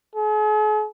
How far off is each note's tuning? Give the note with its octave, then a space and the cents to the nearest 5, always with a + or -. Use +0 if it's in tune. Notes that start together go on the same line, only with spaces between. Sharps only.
G#4 +45